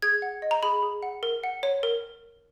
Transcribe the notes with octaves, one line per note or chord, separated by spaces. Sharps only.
G#4 G#6
F#5
D#5
A#5
G#4 B5
G#4
F#5
A#4
F#5
C#5
A#4